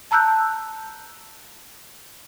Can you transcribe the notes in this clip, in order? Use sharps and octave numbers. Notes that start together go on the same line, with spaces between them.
A5 A#5 E6 F#6 G6